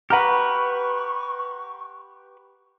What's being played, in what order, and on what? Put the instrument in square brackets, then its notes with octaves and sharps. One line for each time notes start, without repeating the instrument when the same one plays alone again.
[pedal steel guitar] G4 B4 [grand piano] F#5 A#5 F6 [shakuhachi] C#6